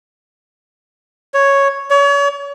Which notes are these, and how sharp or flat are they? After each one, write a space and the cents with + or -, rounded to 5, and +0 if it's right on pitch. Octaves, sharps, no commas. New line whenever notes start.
C#5 +0
C#5 +35